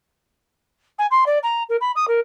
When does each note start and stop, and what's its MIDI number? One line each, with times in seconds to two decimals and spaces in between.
0.98 1.06 80
1.11 1.24 84
1.26 1.38 74
1.43 1.63 82
1.69 1.76 70
1.80 1.91 83
1.95 2.05 87
2.07 2.20 70